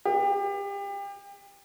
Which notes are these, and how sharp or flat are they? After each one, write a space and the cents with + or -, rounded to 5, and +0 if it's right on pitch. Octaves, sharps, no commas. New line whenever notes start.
G4 +30